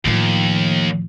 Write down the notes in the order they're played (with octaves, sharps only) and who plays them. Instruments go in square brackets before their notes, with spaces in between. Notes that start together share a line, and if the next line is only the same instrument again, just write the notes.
[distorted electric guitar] D#2 [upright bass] A2 F3